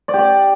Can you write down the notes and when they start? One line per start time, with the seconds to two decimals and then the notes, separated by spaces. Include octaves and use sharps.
0.08 D5
0.13 G4
0.18 D5